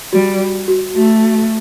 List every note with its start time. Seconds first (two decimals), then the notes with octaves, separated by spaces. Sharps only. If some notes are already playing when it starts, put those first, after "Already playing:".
0.13 G3 F#4
0.68 F#4
0.96 A3 F#4